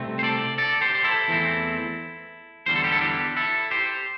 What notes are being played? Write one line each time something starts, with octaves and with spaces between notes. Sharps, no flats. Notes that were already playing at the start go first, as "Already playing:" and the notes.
Already playing: C2 C3 A3 C4
C5
A4 D5
A4 D5
G4 C5
C5
E4 A4
E2 E3 A3 C4
E2 D3 G3 C5
A4
G4
E4 A4
D4 G4
E4 A4
G4 C5